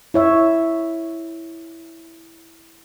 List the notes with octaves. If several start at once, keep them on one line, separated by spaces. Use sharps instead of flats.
E4 C#5 E5